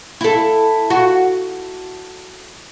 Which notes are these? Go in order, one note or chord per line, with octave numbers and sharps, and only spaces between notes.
E4 A4
F#4